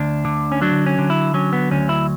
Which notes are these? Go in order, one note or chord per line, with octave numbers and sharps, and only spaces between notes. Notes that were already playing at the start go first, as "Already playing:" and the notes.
Already playing: D2 D4
D3
C#4
F#3 D4
C#4
D3
E4
F#3 C#4
B3
D2 C#4
E4